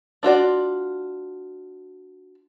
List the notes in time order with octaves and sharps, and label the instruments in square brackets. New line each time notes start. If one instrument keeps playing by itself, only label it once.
[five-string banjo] D4 F4 F#4 D5